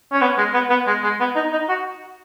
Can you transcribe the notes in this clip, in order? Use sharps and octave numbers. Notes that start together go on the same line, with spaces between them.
C#4
B3
G#3
B3
B3
G#3
G#3
B3
D#4
D#4
F#4